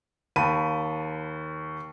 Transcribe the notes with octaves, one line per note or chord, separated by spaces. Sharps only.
D#2 A5 B5 D#7